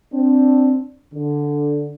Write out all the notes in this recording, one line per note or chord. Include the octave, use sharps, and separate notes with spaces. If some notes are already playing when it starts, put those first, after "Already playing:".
C4 D4
D3